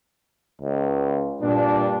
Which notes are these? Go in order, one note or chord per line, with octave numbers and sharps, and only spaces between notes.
C#2
G2 A#2 D4